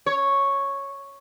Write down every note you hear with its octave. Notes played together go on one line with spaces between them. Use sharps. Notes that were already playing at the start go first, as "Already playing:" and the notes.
C#5